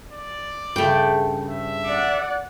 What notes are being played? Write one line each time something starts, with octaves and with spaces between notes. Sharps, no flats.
D5
G2 C#3 A3 G5
E5
D5 F#5